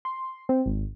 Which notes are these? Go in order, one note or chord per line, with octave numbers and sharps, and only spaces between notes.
C6
C4
G#1